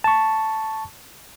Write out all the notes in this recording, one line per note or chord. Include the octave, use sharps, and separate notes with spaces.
A5 C#6